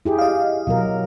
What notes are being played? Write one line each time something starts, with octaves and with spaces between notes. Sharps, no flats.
E4 G4 G#4
D#5 F5
B2 F#3 A#4